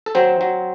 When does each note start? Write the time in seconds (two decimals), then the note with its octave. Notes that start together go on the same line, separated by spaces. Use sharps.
0.06 A4
0.15 F#3 C4 C5
0.41 F#3